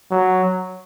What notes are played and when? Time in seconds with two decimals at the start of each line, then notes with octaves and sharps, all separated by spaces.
0.11 F#3